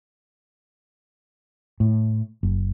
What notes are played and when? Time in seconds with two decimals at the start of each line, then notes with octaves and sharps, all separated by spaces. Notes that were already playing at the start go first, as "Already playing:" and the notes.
1.80 A2
2.43 F#1